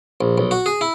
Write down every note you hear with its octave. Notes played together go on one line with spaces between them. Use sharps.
A#1
B1
F#4
G#4
E4